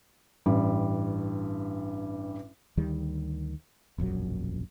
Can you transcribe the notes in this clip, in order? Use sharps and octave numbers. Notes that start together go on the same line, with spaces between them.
A1 G2 G3
D2 D#3 G3
E1 A#1 F#2 F#3